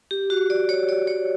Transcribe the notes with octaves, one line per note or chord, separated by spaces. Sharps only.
G4
F#4
D5
C#5
D5
C#5